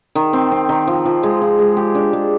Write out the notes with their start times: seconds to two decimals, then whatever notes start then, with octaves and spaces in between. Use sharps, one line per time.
0.15 D#3
0.33 C4
0.52 C4
0.69 D#3
0.87 F3
1.06 F3
1.23 G#3
1.42 F3
1.59 G#3
1.77 G4
1.95 D4
2.13 G#3